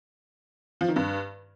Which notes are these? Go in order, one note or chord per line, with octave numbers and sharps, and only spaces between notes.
F3
D#3
G2